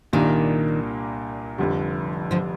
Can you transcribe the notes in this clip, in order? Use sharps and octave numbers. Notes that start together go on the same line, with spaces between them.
C2 A#2 D#3 G3 A#3 D4
F1 F2 D3 G3
D3 F3